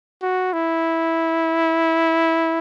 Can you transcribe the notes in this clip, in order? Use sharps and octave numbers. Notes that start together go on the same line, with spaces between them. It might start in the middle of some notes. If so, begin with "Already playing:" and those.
F#4
E4